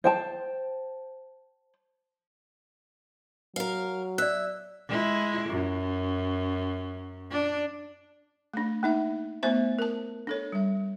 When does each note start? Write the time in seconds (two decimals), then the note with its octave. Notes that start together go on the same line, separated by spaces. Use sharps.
0.04 C5 G5 A5
3.56 F#3 A#4 F5
4.18 D5 E5 F#6
4.88 G#3 E4
5.50 F#2
7.31 D4
8.54 A3 D4
8.83 A#3 D#4 E5
9.43 A3 B3 C5 E5
9.79 A#4 A5
10.27 D4 A4 C#5
10.52 G3 E5